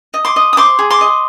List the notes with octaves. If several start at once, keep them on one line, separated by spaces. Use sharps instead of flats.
D#5
C6 D6
D#5
D#6
C5 C6 D6
G#4
C6 D6
D#5